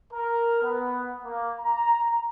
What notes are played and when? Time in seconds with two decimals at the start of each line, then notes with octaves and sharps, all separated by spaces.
0.13 A#4
0.63 B3
1.25 A#3
1.60 A#5